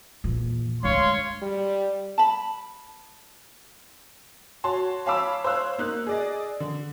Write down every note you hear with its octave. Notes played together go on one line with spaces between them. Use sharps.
E2 A#2
D2 G#2 C#5 F5 C6
G3
A5 B5
F#4 C#5 A5 C6
C#5 F5 A5 B5 D6 E6
C5 C#5 F5 E6 F#6
A#3 D#4 F#6
G#4 D5 D#5
D3